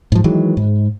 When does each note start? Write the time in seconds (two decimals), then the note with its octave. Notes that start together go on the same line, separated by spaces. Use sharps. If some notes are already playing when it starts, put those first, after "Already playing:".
0.12 G#2 F3
0.24 D#3 E3 F#3 G#3
0.57 G#2